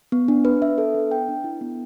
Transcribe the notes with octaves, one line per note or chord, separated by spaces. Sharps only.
B3
D4
B4
E5
A4
B3
G5
D4
E4
B3